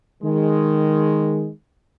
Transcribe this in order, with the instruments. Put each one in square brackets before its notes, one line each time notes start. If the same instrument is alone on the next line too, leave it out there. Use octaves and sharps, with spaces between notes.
[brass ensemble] D#3 G#3